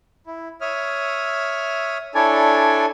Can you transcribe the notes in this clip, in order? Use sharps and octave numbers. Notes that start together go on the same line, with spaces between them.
E4
C#5 E5 D#6 F6
D4 E4 A4 C#5 D5 G#5